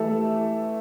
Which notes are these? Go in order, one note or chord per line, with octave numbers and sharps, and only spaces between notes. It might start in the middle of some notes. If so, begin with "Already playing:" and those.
Already playing: E3 A3 E4 G4 A4